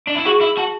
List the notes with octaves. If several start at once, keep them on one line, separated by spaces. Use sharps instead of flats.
D4
E4
F#4 G#4
E4
F#4 A5